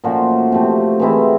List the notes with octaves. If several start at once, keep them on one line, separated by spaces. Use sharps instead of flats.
A#2 F3 A3 C#4 F#4
C3 F3 A3 C4
E3 G#3 C4 E4